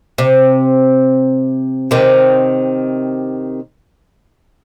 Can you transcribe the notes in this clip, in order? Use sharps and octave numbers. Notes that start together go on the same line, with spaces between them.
C3
C3 D#3